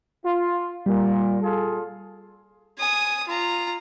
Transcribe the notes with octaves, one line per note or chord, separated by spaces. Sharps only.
F4
A#2 G3
F4 G#4 A4
G#5 D#6
F4 A#5